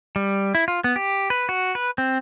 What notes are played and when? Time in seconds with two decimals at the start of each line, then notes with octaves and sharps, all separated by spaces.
0.16 G3
0.55 E4
0.68 F4
0.84 B3
0.96 G4
1.30 B4
1.49 F#4
1.75 B4
1.98 C4